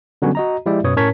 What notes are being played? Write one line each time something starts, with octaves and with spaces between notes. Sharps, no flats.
D3 F#3 G3 B3 C#4 F#4
F#4 D#5 A#5
F3 G#3 E4 G4 D5 E5
F#2 B2 B4 C#5 D#6
A2 C#4 A#4 C#5 A5 B6